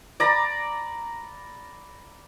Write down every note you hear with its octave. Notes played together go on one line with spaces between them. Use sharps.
D5 A#5 B5